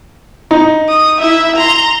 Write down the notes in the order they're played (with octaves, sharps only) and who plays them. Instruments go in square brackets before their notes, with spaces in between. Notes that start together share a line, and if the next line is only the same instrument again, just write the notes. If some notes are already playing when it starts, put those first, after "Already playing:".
[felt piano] D#4
[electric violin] D#6
E4 E5
A#5 C6